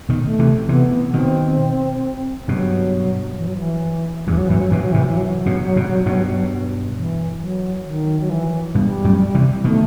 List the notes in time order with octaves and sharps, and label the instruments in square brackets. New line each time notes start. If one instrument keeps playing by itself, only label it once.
[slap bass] B2 D#3
[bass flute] A3
[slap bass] C3 E3
[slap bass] C3 E3 [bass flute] B3
[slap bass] B2 D#3 [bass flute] C4
[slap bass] G2 B2 [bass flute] F#3
[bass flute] E3
F#3
E3
[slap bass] E2 G2 [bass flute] E3
[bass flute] F#3
[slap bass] F#2 A2 [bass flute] E3
[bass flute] F#3
[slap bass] G2 B2 [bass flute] E3
[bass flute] F#3
[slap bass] A2 C3 [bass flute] E3
[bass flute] E3
F#3
[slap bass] G2 B2
G2 B2
G2 B2
[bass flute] E3
F#3
D#3
F#3
E3
[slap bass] G2 B2 [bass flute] G3
[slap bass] F#2 A2
C3 E3
[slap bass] B2 D#3 [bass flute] A3